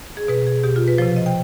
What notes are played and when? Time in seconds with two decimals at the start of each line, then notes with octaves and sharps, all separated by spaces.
0.17 G#4
0.28 B2 B4
0.47 G#4
0.64 B2 G4
0.76 F4
0.88 B4
0.98 C3 F3 C5
1.16 D#5
1.26 G5